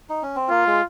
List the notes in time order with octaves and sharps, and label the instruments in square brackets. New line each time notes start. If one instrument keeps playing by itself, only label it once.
[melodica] D#4
C#4
C4
[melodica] A#3 [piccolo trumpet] F4
[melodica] G#3